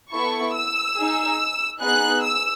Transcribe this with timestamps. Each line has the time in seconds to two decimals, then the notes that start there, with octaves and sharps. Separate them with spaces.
0.12 B3 E4 A4 C#6
0.55 E6
0.97 D#4 G#4
1.81 B3 D#4 G#4 F#6
2.24 E6